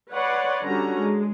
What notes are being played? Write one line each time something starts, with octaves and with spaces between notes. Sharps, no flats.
B4 C#5 D5 F#5 C6
D3 G3 C#4 F#4 A#5
G#3